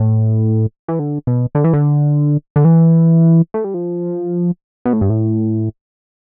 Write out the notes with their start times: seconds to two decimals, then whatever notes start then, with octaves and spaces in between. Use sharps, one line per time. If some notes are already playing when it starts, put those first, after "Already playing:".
Already playing: A2
0.88 E3
0.99 D3
1.27 B2
1.55 D3
1.64 E3
1.73 D3
2.56 D3
2.65 E3
3.54 A3
3.64 G3
3.74 F3
4.85 B2
4.93 A2
5.01 G2
5.10 A2